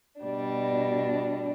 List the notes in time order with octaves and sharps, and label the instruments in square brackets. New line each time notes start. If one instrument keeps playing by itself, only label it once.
[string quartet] B2 G3 D4